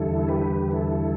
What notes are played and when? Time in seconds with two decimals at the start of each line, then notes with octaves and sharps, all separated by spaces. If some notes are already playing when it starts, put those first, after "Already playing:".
Already playing: E2 D3 G3 E4 A4
0.28 G4 B4
0.71 E4 A4